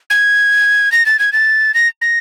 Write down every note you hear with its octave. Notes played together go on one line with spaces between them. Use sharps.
G#6
A#6
A6
G#6
A6
A#6
A#6